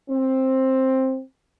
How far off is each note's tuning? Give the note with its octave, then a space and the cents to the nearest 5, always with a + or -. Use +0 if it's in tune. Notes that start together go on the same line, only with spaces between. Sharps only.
C4 +10